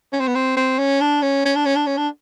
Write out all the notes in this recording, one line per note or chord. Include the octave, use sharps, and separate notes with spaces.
C#4
C4
B3
C4
C4
C#4
D4
C#4
C#4
D4
C#4
D4
C#4
D4